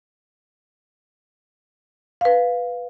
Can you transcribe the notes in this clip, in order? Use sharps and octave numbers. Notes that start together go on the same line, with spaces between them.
B4 F5